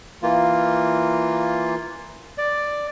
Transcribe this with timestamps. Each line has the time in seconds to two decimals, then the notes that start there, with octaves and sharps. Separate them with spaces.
0.22 E3 A#3 F4
2.38 D5